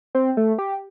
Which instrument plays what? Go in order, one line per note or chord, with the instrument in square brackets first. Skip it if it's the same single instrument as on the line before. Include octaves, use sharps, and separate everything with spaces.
[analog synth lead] C4
A3
G4